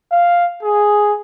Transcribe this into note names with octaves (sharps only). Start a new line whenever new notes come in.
F5
G#4